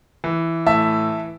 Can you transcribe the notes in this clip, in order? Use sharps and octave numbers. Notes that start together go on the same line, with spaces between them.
E3
A2 E5 A5